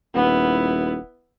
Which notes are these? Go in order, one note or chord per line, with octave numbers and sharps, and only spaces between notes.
D#1 B3 E4